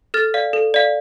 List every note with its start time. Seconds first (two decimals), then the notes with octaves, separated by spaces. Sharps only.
0.14 A4 F6 A6
0.34 D5 F5
0.53 A4
0.74 D5 F5